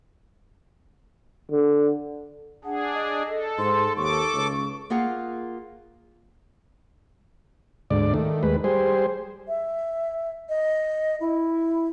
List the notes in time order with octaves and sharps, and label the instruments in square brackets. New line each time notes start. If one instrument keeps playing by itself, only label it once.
[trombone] D3
[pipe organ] D4 G#4 [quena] F#5
[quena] D#5
[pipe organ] A4
[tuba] G#2 [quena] C6
[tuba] D#2 [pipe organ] A4 D6 [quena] C#6
[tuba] C#2
[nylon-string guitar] A#3 F4 G#4 F#5
[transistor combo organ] D2 G#2 D5
D#3 A3
D#2 G#3 B4
G3 G#4 C5
[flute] E5
D#5
E4